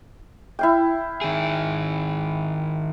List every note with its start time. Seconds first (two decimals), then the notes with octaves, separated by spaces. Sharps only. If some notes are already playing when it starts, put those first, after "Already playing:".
0.59 E4 F5 G5
1.21 D#3 G#4